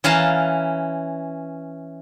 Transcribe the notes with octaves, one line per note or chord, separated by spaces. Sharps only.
E3 C#4 F5 A5 A#5